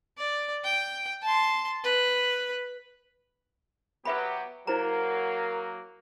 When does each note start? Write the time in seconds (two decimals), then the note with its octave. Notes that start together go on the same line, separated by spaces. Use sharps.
0.17 D5
0.64 G5
1.22 A5 C6
1.83 B4
4.05 F#3 B3 G4 B4 E5 B5
4.67 F#3 A#3 E4 A#4 C5 A#5